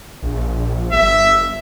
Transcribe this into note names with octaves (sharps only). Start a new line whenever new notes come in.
A#1
G1 E5